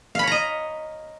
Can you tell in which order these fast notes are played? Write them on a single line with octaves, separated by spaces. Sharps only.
F5 B5 C#5 A#5 D#5